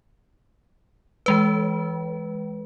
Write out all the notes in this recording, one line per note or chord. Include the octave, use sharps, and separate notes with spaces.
E3 G#3 B4